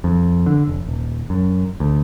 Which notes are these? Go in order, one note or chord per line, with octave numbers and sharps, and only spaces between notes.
F2
D3
F1
D#1
F#2
D2